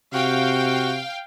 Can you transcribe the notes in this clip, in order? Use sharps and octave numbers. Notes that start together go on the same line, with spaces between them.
C3 F#4 F5 G5